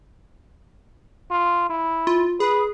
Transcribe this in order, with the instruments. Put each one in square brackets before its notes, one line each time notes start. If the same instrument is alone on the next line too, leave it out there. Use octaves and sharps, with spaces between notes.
[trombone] F4
E4
[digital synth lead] F4
[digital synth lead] G#4 [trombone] B4